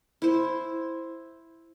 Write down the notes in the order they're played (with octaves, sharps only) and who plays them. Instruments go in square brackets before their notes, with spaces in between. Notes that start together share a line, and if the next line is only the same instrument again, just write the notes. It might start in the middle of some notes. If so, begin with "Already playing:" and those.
[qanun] E4 C5